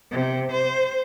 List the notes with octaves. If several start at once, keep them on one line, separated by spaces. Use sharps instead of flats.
C3
C5